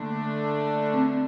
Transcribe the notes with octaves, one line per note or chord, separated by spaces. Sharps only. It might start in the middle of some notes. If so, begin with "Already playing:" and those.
Already playing: D3 A3 A#3 D4
C4